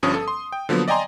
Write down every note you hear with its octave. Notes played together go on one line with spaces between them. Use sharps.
G1 G2 F3 C#4 D#6
A4
C6
G5
D3 F3 F#3 A#3 B3
D5 D#5 G5 G#5 A#5 C6